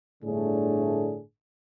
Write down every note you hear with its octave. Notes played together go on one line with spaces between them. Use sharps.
G1 A2 D3 A3 D4 G#4